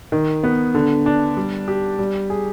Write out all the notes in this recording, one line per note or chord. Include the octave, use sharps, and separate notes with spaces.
D#3
B3
D3
D4
G3
G4
G3
G#4